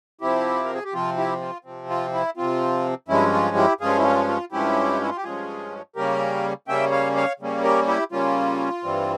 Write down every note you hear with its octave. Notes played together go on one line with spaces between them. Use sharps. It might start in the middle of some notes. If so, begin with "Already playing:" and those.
C3 F3 C4 E4 G4
A#4
G#4
G4
C3 F3 C4 F4
E4 G4
F4
C3 F3 C4
F4
E4
C3 F3 C4 F4
G2 F3 G#3 C#4 E4
F4
E4 G4
G2 F3 G#3 C#4 F4 G#4
E4
F4
F4
G2 F3 G#3 C#4 E4 G4
E4
F4
G4
G2 F3 G#3 C#4 F4 G#4
C#3 G3 A#3 C#4 G4 A#4
C#3 G3 A#3 C#4 E5 G5
C#5 F5
C#5 F5
C#3 G3 A#3 C#4
G4 A#4
E4 G4
C#3 G3 A#3 C#4 F4
G2 E3 G3 C4